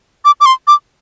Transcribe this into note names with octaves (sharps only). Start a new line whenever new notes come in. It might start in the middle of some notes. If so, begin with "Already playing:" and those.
D6
D6
C6
D6